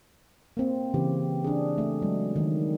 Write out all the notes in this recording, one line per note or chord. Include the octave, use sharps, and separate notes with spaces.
A#3 C4
C#3 E3 G4
D4 G#4
A3
F#3 G#3
D#3